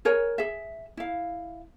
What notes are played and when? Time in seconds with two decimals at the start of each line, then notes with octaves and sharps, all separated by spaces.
0.05 G#4 A#4 C#5 G#5
0.38 G#4 E5
0.97 E4 F5